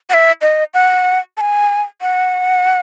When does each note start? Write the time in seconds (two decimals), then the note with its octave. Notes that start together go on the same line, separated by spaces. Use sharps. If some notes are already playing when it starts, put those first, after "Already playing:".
0.10 F#5
0.14 E5
0.42 D#5
0.74 F#5
1.37 A5
1.41 G#5
2.02 F#5